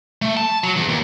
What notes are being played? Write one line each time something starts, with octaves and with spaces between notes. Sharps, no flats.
A3
A5
F#3
E2
D#2